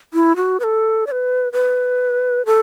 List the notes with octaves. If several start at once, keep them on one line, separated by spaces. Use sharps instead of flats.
E4
F#4
B4
A4
D5
B4
B4
A4